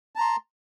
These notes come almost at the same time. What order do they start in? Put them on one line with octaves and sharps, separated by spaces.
A5 A#5 C6